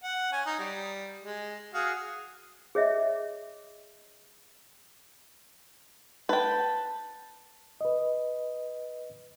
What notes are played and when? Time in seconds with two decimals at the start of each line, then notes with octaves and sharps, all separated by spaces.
0.04 F#5
0.32 C#4 G#5
0.46 D#4
0.59 G3
1.24 G#3
1.74 F#4 G#4 F5
2.75 G#4 C#5 D#5 E5
6.29 B4 G5 A5
7.81 B4 D#5